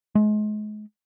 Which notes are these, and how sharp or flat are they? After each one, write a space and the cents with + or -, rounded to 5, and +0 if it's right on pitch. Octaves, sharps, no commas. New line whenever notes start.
G#3 +35